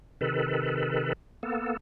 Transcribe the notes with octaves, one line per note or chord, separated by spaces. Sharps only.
C3 D#3 A4 B4
A#3 B3 A4